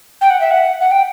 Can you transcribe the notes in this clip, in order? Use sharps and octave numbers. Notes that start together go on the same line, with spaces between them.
G5
F#5
E5
F#5
F#5
G5